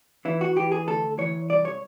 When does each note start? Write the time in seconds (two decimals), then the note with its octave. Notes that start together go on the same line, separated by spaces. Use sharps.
0.25 E3 E4
0.41 F#4
0.56 E3 G4
0.72 G#4
0.87 D2 A4
1.18 E3 C#5
1.50 C2 D5
1.65 C#5